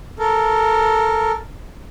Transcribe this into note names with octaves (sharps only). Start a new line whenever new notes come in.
A4 A#4